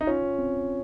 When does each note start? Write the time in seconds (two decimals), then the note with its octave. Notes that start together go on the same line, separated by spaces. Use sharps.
0.01 D#4
0.07 C#4 F4
0.39 C4